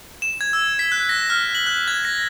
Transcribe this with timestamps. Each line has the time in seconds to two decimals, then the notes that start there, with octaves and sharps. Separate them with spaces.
0.22 E7
0.41 G#6
0.53 E6
0.79 B6
0.92 F#6
1.09 A#6
1.30 F6
1.55 F#7
1.67 F#6
1.88 G#6
2.05 A#6